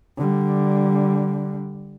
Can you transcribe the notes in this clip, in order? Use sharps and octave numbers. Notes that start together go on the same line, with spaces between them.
D3 G3